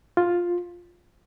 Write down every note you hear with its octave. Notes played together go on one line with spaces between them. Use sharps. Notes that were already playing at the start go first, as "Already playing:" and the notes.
F4